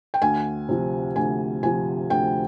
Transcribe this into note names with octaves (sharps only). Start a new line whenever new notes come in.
G5
D2 G#5
C3 F3
D2 G#5
C3 F3 G#5
D2 G5